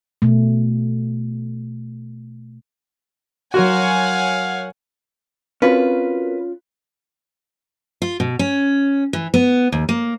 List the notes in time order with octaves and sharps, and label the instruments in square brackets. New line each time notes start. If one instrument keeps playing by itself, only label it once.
[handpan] B2 A3
[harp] F#3 A#4 C6 [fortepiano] F#4 [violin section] C#5 F#5 G#5 [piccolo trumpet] F5
[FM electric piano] C4 F#4 A#4 [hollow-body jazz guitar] C#4 F4 C#5 [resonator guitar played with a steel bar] B4
[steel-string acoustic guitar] F4
B2
C#4
E3
B3
D#2
A#3